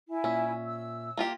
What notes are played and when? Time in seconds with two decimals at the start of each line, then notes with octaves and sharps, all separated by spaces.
0.10 E4 G#5
0.24 A#2 C#4 E5
0.65 E6
1.17 A#3 F4 G4